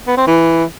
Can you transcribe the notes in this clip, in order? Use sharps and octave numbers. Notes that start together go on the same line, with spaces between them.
B3
C4
E3